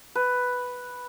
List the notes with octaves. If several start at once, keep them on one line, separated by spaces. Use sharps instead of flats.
B4